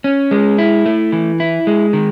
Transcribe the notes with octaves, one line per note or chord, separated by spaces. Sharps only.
C#4
G#3
E4
A3
E3
E4
G#3
D#3